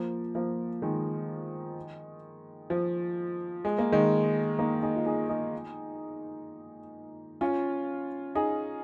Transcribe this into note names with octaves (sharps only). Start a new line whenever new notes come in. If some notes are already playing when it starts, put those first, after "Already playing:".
Already playing: F3 A#3
F3 A#3
D#3 G#3
F3
G#3
A#3
D#3 G#3
A#3 D#4
D#4 G#4
F4
D#4 G#4
D#4 G#4
C#4 F4
D#4 G#4